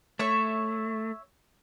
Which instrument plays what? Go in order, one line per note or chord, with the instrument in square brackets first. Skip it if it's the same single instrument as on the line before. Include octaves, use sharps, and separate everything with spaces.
[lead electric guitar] A3 [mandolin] C#5 E5 C#6